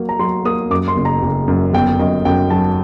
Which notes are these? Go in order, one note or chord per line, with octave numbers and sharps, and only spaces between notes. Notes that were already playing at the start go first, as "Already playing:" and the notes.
Already playing: F#3 A#3
A#5
F#3 C6
A#3 D#6
F#2 D6
C6
F#1
A#5
F#1
F#2
G1 G5
F#2 D#5
F#2 G5
F#3 A5